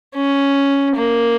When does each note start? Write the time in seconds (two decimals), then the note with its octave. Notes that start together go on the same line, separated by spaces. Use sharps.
0.15 C#4
0.96 A#3